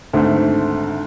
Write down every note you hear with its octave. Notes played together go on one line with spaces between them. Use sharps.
D2 G#2 D#3 A3 C4